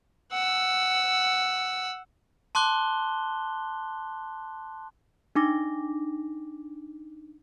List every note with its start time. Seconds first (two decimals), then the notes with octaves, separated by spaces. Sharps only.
0.32 F#5 E6
2.55 A5 C6 D6 F#6 G7
5.35 D4 D#4 D6 A#6